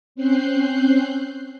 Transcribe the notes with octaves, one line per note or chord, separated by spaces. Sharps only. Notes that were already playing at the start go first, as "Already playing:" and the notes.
C4 C#4 F#6 G6 C7